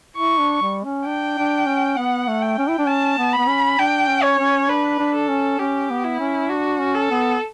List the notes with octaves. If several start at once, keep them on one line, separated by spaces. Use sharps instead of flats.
E4 C#6
D4
G3
C#4
D4 G5
D4
C#4
B3 F#5
A3
G5
C#4
E4
D4
C#4 A5
B3
B3 B5
C#4
D4 G5
C#4
C#5
C#4
D4 B4
D4
A4
C#4
C#4 G4
B3
E4
C#4
D4 F#4
C#4
A4
B3